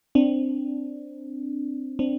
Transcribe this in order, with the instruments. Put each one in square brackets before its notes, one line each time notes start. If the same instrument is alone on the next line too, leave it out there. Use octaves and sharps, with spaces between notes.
[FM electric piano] C4 D4
C4 D4